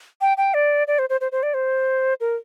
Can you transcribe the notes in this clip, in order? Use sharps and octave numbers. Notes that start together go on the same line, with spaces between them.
G5
G5
D5
D5
C5
C5
C5
C5
D5
C5
A#4